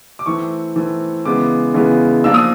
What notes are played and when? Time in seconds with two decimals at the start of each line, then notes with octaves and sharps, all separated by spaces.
0.19 D6
0.26 E3 A3 C4 C#6
0.76 E3 A3 C4
1.25 C#3 E3 G#3 B3 D6
1.74 C#3 E3 G#3 B3
2.24 F3 A#3 D4 E6
2.34 D#6